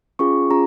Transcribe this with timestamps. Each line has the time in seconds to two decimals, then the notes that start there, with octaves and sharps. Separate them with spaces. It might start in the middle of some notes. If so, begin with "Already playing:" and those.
0.19 C#4 F4 G#4 C#6
0.50 C#4 F4 G#4 A#5